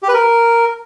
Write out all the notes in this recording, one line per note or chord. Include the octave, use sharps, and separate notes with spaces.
G4
B4
A#4